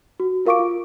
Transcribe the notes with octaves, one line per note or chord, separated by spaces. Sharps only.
F#4
F4 A#4 F5 C#6 D6 D7
F4